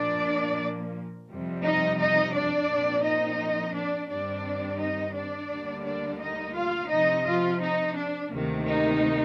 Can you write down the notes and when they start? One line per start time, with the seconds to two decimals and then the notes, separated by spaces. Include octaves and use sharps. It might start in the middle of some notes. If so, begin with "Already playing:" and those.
Already playing: A#2 F3 A#3 D4 D5
1.30 F2 C3 G3
1.64 D#4 D#5
1.99 D#4 D#5
2.34 D4 D5
2.69 A#2 F3 C4
3.04 D#4 D#5
3.75 D4 D5
4.09 G2 D#3 G3 C4 D4 D5
4.80 D#4 D#5
5.15 D4 D5
5.51 D2 D3 G3 A#3
5.85 D4 D5
6.21 D#4 D#5
6.55 F4 F5
6.90 C3 F3 C4 D#4 D#5
7.26 F3 F4
7.61 D#4
7.97 D4
8.30 D2 C3 D#3 A#3
8.66 D#4